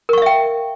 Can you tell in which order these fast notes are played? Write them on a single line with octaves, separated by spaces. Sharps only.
A#4 C#6 F5 E5 G5